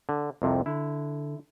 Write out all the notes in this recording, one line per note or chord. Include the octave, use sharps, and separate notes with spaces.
D3
C2 F2 C3
D3 E4